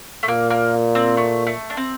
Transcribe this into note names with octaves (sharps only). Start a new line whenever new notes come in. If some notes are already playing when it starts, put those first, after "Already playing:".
A3
A#2 A#3
A#3
C4
A3
A3
D4
C4